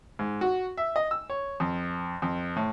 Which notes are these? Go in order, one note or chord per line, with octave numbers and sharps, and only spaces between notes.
G#2
F#4
E5
D#5
E6
C#5
F2
F2
A2